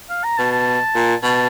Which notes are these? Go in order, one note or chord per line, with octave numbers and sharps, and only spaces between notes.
F5
A#5
B2 A5
A5
A#2
B2 A5